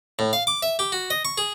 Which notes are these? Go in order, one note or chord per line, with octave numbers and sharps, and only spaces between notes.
A2
F5
D6
E5
G4
F#4
D#5
C#6
G#4